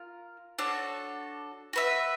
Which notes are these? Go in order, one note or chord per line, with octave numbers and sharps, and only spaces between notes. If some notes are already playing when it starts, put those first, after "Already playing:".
Already playing: F4 A#4
D4 F#4 A4 C#5
F#4 B4 E5